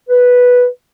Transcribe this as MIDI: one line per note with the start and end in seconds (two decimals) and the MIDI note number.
0.09 0.67 71